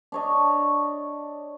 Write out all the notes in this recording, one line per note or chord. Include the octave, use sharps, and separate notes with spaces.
D4 C#5 D#5